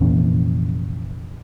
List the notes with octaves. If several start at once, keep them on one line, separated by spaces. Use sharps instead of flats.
F1 A#2 E3 C#4